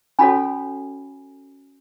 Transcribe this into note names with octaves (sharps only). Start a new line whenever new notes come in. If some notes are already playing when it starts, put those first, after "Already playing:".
C#4 F#4 A4 C#5 G#5 B5